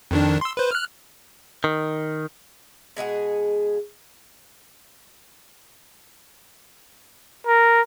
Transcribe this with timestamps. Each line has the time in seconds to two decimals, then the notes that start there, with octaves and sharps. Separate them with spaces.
0.11 F2 D#3 D4
0.41 C6 E6
0.57 B4 C5
0.71 F6 F#6
1.64 D#3
2.97 B2 G#3 G#4 F#5
7.47 A#4